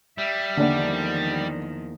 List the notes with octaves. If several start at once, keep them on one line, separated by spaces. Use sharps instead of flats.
G3 E5
E2 D3 D#3 F3 A#3 D4 F#5